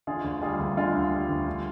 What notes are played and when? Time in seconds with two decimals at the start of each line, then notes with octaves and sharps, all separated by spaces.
0.07 D3 F4 G#4
0.24 D2
0.41 G3 F4 G#4
0.59 D2
0.77 D3 F4
0.95 D2
1.11 G3
1.29 D2
1.47 D3